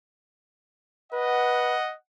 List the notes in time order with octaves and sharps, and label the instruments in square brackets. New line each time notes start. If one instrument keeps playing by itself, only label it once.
[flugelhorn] B4 [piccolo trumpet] D#5 [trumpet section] F#5